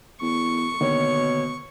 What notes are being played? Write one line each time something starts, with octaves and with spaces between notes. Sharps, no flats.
E2 C#6
B2 D3 D#3 A#3 C#5